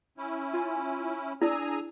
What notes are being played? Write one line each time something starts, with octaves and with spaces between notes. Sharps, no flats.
C#4 E4
F4 G#5
D4 E4 G#4 D5 G#5 A#5 E6